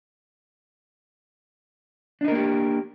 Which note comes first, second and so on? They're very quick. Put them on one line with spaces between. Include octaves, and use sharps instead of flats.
D4 D#4 A#4 A#3 G4